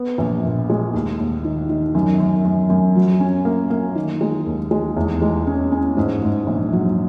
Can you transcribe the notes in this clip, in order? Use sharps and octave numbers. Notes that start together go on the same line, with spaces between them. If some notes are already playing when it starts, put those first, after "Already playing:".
Already playing: B3
A#1
A#2
G#3
D#2
D#2
D#3
D#3
F#2
F#2
F#2
F#2
F#3
C#4
A#3
A#3
D#3
G#3
D#2
G#3
E2
G#3
C#4
C#4
G#2
G#2
A#1
F#3